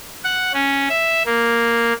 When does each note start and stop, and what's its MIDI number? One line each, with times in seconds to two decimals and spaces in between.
0.24 0.52 78
0.53 0.88 61
0.89 1.23 76
1.26 1.93 58